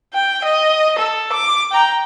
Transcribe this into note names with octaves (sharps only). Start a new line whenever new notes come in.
G5
D#5
A4
D6
G5 A#5